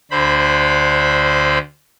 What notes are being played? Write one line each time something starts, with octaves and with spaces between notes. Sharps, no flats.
D2 D3 C5 B5